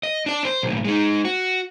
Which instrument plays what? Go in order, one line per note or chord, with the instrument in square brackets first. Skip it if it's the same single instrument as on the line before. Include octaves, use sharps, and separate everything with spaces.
[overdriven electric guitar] D#5
D4 D5
C5
B1 A2
G#3 D#4
F#4